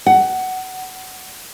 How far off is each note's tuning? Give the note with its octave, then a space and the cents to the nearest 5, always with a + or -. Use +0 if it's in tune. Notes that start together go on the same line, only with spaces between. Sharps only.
F#5 +20